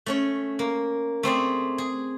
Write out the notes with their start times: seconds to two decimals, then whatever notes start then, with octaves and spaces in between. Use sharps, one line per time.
0.06 A3 C#4 C#5
0.59 A#3
1.23 A3 C4 G#4 D5
1.78 G#4